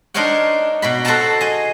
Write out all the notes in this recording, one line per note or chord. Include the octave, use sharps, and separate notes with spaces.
D4 D#4 A#4 C5 C#5 F#5
B2 F#4 B5
F#4 A4 C5 F#5 A5 A#5
G#4 D#5